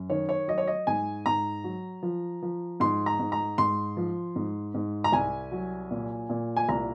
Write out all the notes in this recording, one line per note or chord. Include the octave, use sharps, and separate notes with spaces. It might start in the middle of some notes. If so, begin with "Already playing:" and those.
Already playing: F#2
D#3 C#5
C#5
F#3 D#5
C#5
D#5
G#2 G#5
G#2 A#5
F#3
F3
F3
G#2 C6
A#5
G#2
A#5
G#2 C6
F3
G#2
G#2
A#5
C2 G#5
F#3
A#2
A#2
G#5
C2 A#5